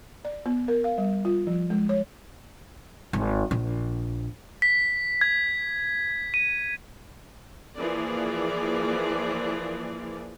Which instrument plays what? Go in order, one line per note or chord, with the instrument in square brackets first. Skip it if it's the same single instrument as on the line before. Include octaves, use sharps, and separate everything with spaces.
[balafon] D5
B3
A#4
F5
G3
F4
F3
G#3
C#5
[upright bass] G#1
A#1
[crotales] B6
G#6
D#7
[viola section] E3 F3 A#3 G#4 D5